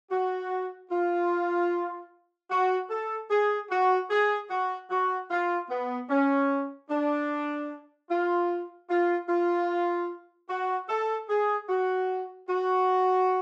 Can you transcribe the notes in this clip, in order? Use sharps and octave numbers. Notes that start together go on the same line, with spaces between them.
F#4
F4
F#4
A4
G#4
F#4
G#4
F#4
F#4
F4
B3
C#4
D4
F4
F4
F4
F#4
A4
G#4
F#4
F#4